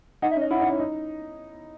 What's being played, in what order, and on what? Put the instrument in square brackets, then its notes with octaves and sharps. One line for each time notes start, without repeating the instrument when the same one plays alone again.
[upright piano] D#4 [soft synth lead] F#5
[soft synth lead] E5
[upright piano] C#4 [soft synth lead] D#5
[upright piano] E4 [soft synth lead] F#5
[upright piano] D#4
C#4
D#4